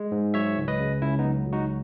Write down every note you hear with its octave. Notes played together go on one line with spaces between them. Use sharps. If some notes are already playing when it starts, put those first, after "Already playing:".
Already playing: G#3
G#2
F#3 C#5 E5
C#2
B4 D#5
C#3
C#2 C#4 E4
B3 D#4
F#3
C#2
D#4 F#4